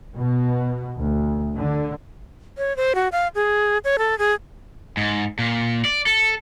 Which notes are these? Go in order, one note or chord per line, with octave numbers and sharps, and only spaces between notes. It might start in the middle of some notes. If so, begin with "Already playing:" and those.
B2
D2
D3
C#5
C5
F#4
F5
G#4
C#5
A4
G#4
G#2
A#2
D5
A4